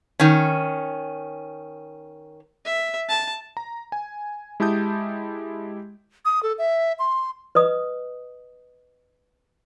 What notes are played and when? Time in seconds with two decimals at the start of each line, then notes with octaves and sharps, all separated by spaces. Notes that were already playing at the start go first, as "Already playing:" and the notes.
0.20 D#3 C#4
2.66 E5
3.09 A5
3.57 A#5
3.92 G#5
4.60 G#3 E4 G4 A5 D#6 G6
6.25 D#6
6.43 A4
6.58 E5
6.99 C6
7.55 B4 D#5 D#6